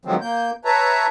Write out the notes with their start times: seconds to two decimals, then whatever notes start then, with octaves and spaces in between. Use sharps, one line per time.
0.05 D3 D#3 F3 F#3 G#3 C4
0.21 A#3 G6
0.65 B4 C#5 E5 A5 A#5